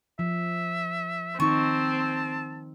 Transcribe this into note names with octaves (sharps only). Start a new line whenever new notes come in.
F3 E5
D#3 C4 D#4 A5 C#6